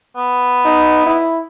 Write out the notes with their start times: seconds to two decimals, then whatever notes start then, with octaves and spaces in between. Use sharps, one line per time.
0.17 B3
0.66 D#4
1.07 E4